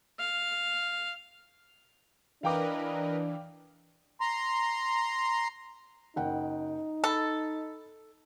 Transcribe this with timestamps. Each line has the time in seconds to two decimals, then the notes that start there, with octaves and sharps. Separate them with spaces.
0.19 F5
2.43 E3 D4 A#4 B4 D#5 F5 G5 D6
4.21 A#5 C6
6.16 F#1 D#4 F#5 G5
7.04 A4 A5 B5